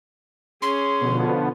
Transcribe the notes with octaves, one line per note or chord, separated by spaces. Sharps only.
C#4 G#4 C6
B2 D3 F3 B3